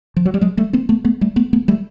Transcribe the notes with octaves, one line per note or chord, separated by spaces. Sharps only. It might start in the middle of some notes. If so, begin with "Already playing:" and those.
F3
F#3
G3
F#3 G#3
G3 A3
A#3 C4
A3 B3
A3 B3
G3 A3
A3 B3
A3 B3
G3 A3